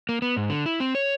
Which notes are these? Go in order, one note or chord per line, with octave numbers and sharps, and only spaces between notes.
A#3
B3
G#2
D3
E4
C4
C#5